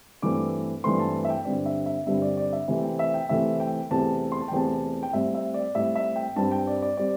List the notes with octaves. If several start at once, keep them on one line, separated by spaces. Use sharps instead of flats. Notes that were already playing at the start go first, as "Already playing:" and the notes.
G2 E3 A3 C4 D6
G2 E3 A3 C4 C6
A5
E5
G5
G2 D3 G3 C4 D5
E5
E5
G2 D3 G3 C4 E5
D5
D5
E5
C3 E3 A3 C4 E5
G5
E5
G5
C3 E3 A3 C4 E5
G5
E2 C3 A3 C4 A5
C6
A5
G5
E2 C3 A3 C4 A5
G5
A2 G3 C4 E5
E5
D5
A2 G3 C4 E5
E5
G5
G2 G3 C4 A5
G5
D5
D5
G3 C4 D5